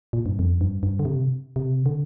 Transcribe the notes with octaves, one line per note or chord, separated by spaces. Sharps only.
A#2
G2
F2
G2
G2
D3
C3
C3
D3